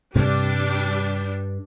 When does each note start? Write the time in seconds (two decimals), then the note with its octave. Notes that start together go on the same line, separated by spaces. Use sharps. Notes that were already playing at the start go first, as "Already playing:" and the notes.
0.16 G2 C3 G3 D4